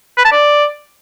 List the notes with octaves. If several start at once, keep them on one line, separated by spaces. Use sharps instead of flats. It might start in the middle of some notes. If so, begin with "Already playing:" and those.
B4
A5
D5